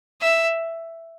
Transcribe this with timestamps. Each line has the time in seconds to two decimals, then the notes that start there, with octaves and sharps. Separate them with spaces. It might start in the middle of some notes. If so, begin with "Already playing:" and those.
0.21 E5